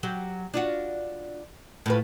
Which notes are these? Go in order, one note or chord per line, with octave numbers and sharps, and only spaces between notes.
F#3 G4
D4 F4 F#4
A2 F4 B4